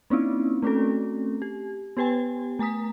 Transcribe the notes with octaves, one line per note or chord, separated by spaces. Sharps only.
A#3 C4 C#4 D#4 E4
A3 C4 C#4 F#4 A4
G4
B3 G4 B4 G5 G#5
A3 G#5 A#5 D#6 B6